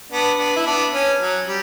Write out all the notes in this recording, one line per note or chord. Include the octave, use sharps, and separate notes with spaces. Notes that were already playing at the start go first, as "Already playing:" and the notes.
B3 D4
B3 D4
E4
B3 D4
C#4
F#3
G3